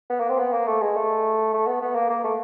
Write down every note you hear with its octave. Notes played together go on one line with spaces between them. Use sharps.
B3
A#3
C4
B3
A#3
A3
G#3
A3
A3
B3
B3
A#3
A#3
A3